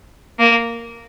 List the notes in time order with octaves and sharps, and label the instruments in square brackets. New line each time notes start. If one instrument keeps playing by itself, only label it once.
[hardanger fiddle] A#3